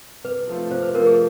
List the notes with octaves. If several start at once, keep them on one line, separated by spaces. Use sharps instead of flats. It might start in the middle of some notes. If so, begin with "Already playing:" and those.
C3 B4
F3 A3 C4 F4
C3 C5
B4
F3 A3 C4 F4 A#4
G#4